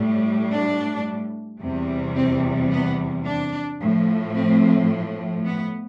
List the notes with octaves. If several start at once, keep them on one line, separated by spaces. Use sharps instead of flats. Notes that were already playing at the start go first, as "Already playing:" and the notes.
Already playing: A2 G3
D4
E2 C3 G3
C4
B3
D4
A2 F3
C4
B3